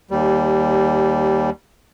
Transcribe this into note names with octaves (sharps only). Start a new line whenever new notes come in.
D#2 G3